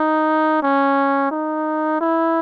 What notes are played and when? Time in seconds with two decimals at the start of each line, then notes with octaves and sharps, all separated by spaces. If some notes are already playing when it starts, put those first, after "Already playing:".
Already playing: D#4
0.63 C#4
1.31 D#4
2.01 E4